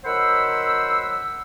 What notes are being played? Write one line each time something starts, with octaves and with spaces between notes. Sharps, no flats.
D#3 F#3 C5 F#5 B5 E6